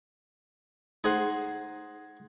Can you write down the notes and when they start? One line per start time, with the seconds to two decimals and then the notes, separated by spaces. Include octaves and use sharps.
1.04 D#4 G#4 C5 F#5